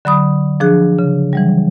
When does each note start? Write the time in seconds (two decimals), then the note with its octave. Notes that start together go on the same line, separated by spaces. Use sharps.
0.05 D3 F#3 B5 D#6
0.60 F3 D4 G#4 F#6
0.99 C#3
1.33 E3 F#3 G3